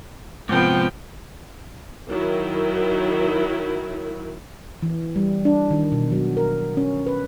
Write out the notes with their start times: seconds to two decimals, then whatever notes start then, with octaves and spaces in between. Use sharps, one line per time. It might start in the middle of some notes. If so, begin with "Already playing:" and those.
0.49 G#2 C3 F3 B3 G5
2.09 D#3 F#3 E4
4.83 E3
5.16 G3
5.45 D4
5.71 D#3
5.92 B2
6.12 F#3
6.37 A#4
6.77 C#4
7.07 B4